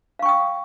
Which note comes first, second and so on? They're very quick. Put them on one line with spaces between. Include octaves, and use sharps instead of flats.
F5 C#6 G5 D#6